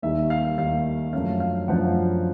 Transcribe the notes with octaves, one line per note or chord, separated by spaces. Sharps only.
D#2 D#3 G3 E5
F5
D#2 D#3 G3 F5
F#2 D3 F3 A3 C#4 F5
F5
F#2 D3 F3 A3 C#4 F#5